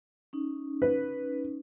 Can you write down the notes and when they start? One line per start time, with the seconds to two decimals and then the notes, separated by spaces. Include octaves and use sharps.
0.33 C#4 D#4
0.82 B4